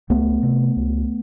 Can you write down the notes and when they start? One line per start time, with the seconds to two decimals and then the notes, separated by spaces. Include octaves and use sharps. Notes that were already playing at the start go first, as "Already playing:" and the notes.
0.10 C#2 A3 B3
0.43 C3
0.76 C#2